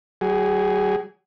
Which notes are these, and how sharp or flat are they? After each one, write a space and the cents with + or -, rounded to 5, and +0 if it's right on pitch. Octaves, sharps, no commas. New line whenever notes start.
F#3 +40 G#4 +0